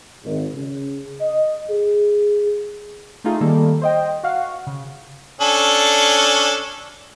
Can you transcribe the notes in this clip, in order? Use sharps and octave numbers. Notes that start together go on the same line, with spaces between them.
G#1
C#3
D#5
G#4
A3 D#4 F4 G#4
D#3 G3 A#3 A4
C5 D#5 G5
F#4 F5 F#5
C#3
C#4 D4 A4